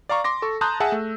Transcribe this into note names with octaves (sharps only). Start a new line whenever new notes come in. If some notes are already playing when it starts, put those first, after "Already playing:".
D5 F5 A#5 C#6
C6 D6 A#6
A4 C#6
A5 A#5 C6 D#6 F#6 G6
G#4 E5 F#5 G#5 A5 E6
A3